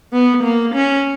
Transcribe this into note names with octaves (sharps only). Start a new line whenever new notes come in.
B3
A#3
C#4